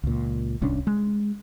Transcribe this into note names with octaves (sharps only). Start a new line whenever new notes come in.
C#2 A#2
D1 C2 C#4 D4
G#3